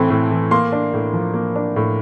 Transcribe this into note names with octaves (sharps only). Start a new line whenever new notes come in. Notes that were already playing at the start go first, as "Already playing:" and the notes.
Already playing: A2 E3 A3 C4
A2
E3
A#3 C6
D4
A2
F3
A#3
D4
A2